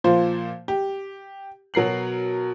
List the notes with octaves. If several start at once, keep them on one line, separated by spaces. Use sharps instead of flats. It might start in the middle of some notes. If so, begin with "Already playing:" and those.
A#2 F3 C5
G4
B2 F#3 A#4 C7 F#7